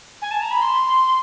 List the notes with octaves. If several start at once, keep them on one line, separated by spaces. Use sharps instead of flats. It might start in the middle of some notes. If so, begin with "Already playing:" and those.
G#5
A5
A#5
B5
C6